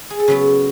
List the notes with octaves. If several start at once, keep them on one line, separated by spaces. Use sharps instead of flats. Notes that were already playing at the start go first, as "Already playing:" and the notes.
G#4
A4
C#3 F#3 B3 B4